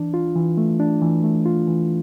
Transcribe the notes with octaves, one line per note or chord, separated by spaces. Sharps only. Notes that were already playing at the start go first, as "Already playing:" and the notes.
Already playing: E3 D4
F4
E3
A3
D4
E3
A3
F4
E3